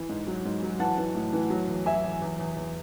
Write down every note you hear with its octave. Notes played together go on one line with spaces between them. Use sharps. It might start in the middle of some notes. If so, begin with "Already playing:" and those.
Already playing: E3
G#2
F#3
G#2
F#3
E3 F#5 A5
E3
A2
E3
F#3
E2
F#3 E5 G#5
E2
E2
E2
E2